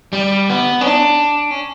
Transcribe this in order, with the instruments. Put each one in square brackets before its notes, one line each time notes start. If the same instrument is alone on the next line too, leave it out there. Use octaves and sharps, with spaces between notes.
[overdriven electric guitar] G3
B3
C#4
D4
C#4